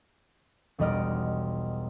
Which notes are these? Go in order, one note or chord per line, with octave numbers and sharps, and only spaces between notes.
E1 B1 G3 D#5 F6 D7